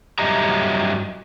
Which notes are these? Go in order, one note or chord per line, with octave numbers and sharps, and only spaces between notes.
G2 F#3 G4 D#5 E5 A#5